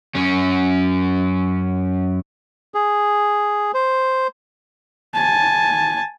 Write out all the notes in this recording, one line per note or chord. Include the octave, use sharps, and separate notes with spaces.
F#2 C#4
G#4
C5
G#5 A5